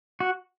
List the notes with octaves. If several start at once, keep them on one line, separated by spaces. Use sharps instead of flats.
F#4